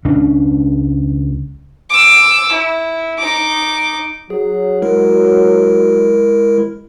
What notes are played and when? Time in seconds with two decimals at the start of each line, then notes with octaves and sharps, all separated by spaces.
0.05 C#2 C#4 D4
1.90 D6 E6
2.52 E4
3.19 D#4 D6
4.30 F#3 G#4
4.82 G#3 E4 A#4